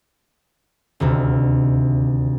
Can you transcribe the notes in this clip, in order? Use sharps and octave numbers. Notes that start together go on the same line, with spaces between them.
D#1 D2 C3